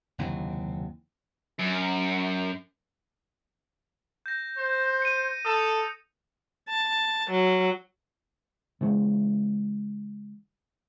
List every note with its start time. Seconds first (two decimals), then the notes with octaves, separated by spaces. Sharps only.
0.18 F#1 D#2 C3 E3
1.59 F#2
4.26 G6 A#6
4.58 C5
5.02 C#7 D#7
5.45 A4 D#6
6.69 A5
7.31 F#3
8.81 C#3 E3 G#3